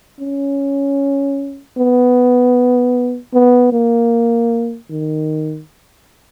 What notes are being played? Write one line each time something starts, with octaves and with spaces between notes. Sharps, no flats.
C#4
B3
B3
A#3
D#3